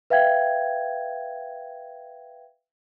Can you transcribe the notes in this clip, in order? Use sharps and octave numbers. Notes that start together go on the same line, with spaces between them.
B4 E5 F5 G5 G#6